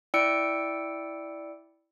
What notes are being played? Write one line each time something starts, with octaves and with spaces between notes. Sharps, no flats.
E4 D5 G5 E6 C#7 D7